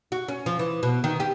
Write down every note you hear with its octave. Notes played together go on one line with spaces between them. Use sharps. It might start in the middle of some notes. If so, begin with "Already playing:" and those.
F#4
C#4
F3
E3
B2
D#3
G4